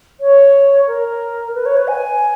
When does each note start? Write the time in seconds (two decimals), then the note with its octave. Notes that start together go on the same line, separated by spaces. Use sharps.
0.21 C#5
0.87 A#4
1.55 B4
1.66 C#5
1.77 B4
1.88 G#5